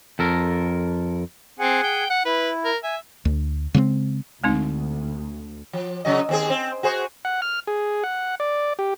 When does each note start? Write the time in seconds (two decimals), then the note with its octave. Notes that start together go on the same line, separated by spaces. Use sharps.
0.19 F2 A4 A#4
1.59 C4 G#4 F#5 G#5
1.84 G5
2.10 F#5
2.25 E4 B4
2.65 A#4
2.84 E5 G#5
3.25 D2
3.74 C#3 G#3 B3 C4
4.44 D2 G#3 C4 D#4
5.73 F3
6.05 C#3 F#3 D#5
6.29 D#2 C4 G#4
6.50 C4
6.83 F#4 G#4 C5
7.25 F#5
7.42 F6
7.67 G#4
8.04 F#5
8.40 D5
8.79 G4